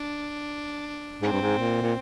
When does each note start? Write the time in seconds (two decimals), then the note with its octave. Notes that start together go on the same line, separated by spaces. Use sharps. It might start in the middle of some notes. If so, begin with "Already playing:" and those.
Already playing: D4
1.22 G#2 C4
1.32 G2
1.41 G#2
1.58 A#2
1.82 A#2